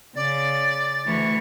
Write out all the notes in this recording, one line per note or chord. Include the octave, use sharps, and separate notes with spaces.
C#3 D5 A6
D2 E3 C#6